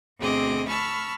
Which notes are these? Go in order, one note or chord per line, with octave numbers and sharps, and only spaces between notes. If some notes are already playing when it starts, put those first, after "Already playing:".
D2 B2 C4 G#4 D#5 D6
A5 B5 C#6 E6 F6